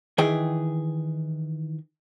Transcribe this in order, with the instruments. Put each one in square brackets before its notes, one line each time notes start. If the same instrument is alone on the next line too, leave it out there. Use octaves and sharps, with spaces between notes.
[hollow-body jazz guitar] D#3 E3 G#4 G5